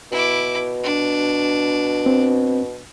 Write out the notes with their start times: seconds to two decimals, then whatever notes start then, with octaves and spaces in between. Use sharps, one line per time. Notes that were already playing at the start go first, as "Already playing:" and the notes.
0.12 B2 E4 D6
0.83 D4
2.06 C4